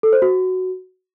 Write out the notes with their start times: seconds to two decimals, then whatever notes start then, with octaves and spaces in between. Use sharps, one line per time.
0.03 A4
0.13 C5
0.22 F#4